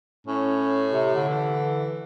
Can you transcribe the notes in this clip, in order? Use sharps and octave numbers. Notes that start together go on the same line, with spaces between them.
A2 C#4
C3
D3
E3